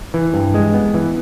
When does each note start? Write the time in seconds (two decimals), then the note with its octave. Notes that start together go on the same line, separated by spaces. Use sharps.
0.14 E3
0.34 G2
0.54 G#3
0.74 B3
0.94 E3